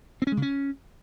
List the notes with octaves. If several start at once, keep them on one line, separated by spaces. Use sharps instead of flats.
C4
C#4
G#3
C#3
C#4